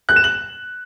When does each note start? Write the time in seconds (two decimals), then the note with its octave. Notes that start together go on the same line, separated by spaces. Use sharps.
0.09 F#6
0.16 E7
0.24 F#7